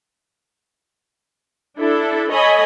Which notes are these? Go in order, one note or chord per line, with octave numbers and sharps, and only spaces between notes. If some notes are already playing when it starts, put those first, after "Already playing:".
D4 E4 A4
A4 C#5 D#5 G#5 B5